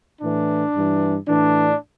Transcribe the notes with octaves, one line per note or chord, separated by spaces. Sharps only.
A2 E3 D4
G2 E3
A2 E3 D4